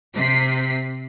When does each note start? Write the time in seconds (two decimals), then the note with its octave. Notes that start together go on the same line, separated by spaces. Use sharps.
0.15 C3 B6 C7